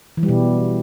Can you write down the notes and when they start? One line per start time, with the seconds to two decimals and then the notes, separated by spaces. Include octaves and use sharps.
0.17 E3
0.23 G3
0.28 B2